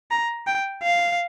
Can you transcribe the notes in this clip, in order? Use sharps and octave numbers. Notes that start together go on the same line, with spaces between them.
A#5
G5
F5